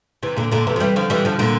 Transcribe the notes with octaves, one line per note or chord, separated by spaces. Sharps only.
C3 E3
A#2 D3
A#2 D3
C3 E3
F3
E3 G3
D3 F3
E3 G3
D3 F3
A#2 D3